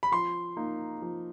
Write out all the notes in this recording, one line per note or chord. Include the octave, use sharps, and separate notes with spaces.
B5
F3 C6
A#3 D#4
F3